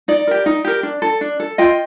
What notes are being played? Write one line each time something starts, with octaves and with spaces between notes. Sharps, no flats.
D#4 D5
G4 A#4
D#4
G4 A#4
D4
A4
D4
A4
F4 D#5 G5